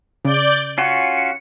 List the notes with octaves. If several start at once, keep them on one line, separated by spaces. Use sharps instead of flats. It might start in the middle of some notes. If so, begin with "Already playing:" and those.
C#3 D5 G6
C#4 F4 F#4 C#7